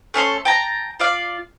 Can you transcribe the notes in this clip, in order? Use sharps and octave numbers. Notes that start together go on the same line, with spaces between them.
A3 C#4 A4 C6
G5 A5 A#5
F4 D5 F5